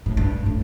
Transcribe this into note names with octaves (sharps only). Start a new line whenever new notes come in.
A2
G2
A2